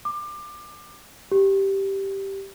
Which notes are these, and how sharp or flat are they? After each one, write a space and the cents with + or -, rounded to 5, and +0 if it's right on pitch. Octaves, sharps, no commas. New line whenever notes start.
D6 +25
G4 -5